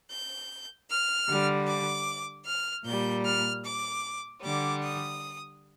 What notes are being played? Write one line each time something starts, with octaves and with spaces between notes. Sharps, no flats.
G6
F6
D3 G3
D6
F6
A#2 G3 G6
F6
D6
D3 G3 D6
D#6